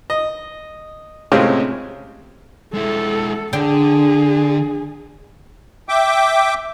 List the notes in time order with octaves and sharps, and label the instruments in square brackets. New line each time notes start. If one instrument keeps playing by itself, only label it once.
[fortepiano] D#5
A2 C3 G#3 C4 C#4 F4
[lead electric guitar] G#3 E4 [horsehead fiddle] A4
[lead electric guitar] D3 [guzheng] D4 G5 [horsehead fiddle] G#4
[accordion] E5 G5 D6